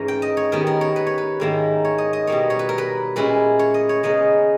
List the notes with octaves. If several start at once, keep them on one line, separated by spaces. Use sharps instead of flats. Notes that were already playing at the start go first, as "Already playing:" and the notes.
Already playing: G#2 E3 A#3 C#4 A#5
G5
D#5
C#5
D#3 G3 B3 A#4
A#4
C#5
B4
C#5
B4
G#2 D#3 A#3 E4
C#5
D#5
D#5
B2 G3 A#3 C#5
C#5
B4
A#4
B4
A#2 G#3 C#4 E4 B4
C#5
D#5
C#5
C#3 G#3 B3 D#4 D#5